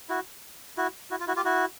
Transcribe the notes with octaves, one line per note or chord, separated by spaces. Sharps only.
E4 F#4
E4 F#4
E4 F#4
F4
E4 F#4
F4 G4
E4 F#4